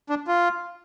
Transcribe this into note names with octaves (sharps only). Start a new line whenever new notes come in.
D4
F4